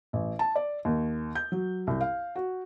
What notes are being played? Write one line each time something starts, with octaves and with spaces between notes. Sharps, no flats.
A1
A5
D5
D#2
G6
F#3
C2
F5
F#4